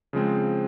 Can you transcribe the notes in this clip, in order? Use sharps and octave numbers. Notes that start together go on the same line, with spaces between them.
C#3 F3 G#3 C4